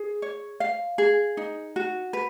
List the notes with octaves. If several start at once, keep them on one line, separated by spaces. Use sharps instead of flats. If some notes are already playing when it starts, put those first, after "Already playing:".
Already playing: G#4
C#5
F5
G#4
D#4
F#4
B4